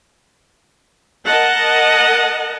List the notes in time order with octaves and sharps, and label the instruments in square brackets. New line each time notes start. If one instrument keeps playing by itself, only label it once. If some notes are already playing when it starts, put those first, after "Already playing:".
[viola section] A#4 D#5 F#5 A5